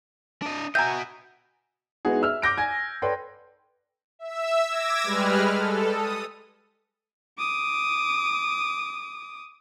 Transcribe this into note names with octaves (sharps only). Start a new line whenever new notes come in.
D4 D#5
F#4 D#5 E5 G5 G#5 A#5 G6
G#3 B3 D#4 E4 F#4 G#4
E5 E6 F6
D6 G6 A#6 D7
G#5 G#6
A4 B4 C#5 D5 G5 C6
E5 E6
D6 E6 G#6 A#6
G3 G#3 B4 F6
A4
D#6
D6 D#6